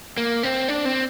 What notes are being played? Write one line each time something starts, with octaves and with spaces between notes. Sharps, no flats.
A#3
C4
D4
C4